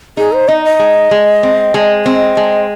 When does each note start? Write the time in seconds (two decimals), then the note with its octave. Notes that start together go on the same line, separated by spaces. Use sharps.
0.17 D#4 G#4
0.33 C5
0.48 D#4 D#5
0.65 D#5
0.79 G#3
1.11 G#3
1.43 C4
1.74 G#3
2.04 C4 D#5
2.37 G#3